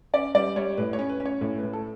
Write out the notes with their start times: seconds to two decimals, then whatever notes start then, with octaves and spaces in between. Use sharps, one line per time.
0.13 C#4 D5
0.35 G3 D5
0.56 G3 C#5
0.77 A2 B4
0.93 C#5
0.99 C#4
1.09 B4
1.20 C#4
1.26 C#5
1.41 A2 C#5
1.58 A2 B4
1.73 A4